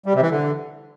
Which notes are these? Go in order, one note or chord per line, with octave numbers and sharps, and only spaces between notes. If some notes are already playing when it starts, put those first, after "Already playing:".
G3
C3
E3
D3